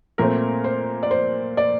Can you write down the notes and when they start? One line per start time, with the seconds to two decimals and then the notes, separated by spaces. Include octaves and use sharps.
0.18 A#2 A3 C4 A#4
0.64 C5
1.03 D5
1.11 C5
1.57 D5